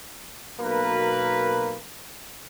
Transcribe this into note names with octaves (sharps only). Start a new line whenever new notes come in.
B1 B2 A#3 A#4 B4